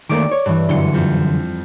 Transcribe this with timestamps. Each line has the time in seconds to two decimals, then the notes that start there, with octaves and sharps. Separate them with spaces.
0.09 D#3 A3 A#3 D5 D6
0.31 C#5
0.46 G2 E3
0.69 F#2 D3 E3 C6 C#7
0.94 F2